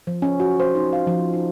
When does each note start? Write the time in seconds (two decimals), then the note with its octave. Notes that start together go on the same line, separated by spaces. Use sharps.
0.07 F3
0.22 C#4
0.40 F#4
0.60 C5
0.75 D#4
0.93 F5
1.07 F3
1.34 D#4